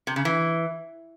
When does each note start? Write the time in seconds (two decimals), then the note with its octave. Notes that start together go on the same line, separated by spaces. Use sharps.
0.07 C3
0.16 C#3
0.25 E3